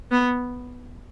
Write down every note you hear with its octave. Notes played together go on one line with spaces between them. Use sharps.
B3